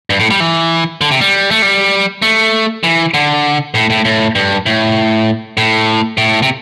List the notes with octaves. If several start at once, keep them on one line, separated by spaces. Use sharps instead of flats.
G2
A2
G3
E3
D3
C3
G3
A3
G3
A3
E3
D3
A2
A2
A2
G2
A2
A2
A2
C3